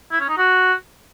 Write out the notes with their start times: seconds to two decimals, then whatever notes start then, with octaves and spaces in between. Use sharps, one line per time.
0.12 E4
0.20 C#4
0.29 D#4
0.38 F#4